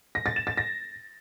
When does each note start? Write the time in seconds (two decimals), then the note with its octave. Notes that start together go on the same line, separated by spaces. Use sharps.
0.15 A#6
0.26 A6
0.36 E7
0.47 A6
0.57 A#6